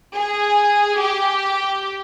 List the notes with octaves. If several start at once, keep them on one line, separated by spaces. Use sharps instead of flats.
G#4
G4